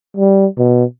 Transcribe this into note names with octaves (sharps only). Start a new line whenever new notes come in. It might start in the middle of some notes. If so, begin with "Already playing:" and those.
G3
B2